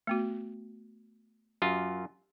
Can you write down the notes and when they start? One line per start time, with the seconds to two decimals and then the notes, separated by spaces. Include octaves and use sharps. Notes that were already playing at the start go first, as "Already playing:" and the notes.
0.07 A3 B3 F#4
1.62 F#2 F4 G4